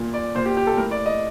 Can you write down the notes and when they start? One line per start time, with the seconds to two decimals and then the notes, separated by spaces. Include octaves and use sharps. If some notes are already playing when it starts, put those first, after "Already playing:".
Already playing: A#2
0.14 D5
0.35 A#2 C5
0.46 G4
0.57 G4
0.67 A4
0.77 A2 A#4
0.91 D5
1.06 D#5